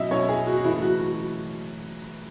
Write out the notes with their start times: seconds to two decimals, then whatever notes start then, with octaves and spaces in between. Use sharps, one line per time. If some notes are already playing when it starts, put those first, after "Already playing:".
Already playing: B2 F#3 C#4 E4 D#5 E5
0.11 B2 F#3 C#4 E4 C#5
0.28 G#4
0.47 F#4
0.57 F#4
0.64 F#2 C#3 E3 A3 E4
0.82 F#4
1.00 F#4